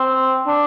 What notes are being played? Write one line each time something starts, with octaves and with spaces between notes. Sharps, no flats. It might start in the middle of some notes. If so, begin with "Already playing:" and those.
Already playing: C4
D4